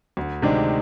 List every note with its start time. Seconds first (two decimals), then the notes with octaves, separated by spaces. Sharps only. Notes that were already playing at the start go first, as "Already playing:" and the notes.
0.17 D2
0.42 C3 D#3 G#3 D4